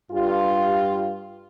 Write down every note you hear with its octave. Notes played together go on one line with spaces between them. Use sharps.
G2 F4 G4